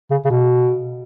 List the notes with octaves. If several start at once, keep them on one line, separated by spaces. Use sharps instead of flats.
C#3
C#3
B2